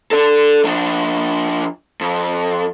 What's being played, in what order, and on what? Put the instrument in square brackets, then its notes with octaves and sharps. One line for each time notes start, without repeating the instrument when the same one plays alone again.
[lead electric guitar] A4 D5
F3 D4
F2